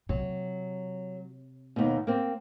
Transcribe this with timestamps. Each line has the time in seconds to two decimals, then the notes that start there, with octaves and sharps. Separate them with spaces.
0.09 C3 F#3
1.76 D#2 B2
2.07 A#3 C4